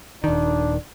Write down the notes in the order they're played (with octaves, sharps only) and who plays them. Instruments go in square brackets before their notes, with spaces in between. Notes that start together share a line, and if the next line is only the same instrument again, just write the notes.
[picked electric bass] D#1 D#3 [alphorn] D4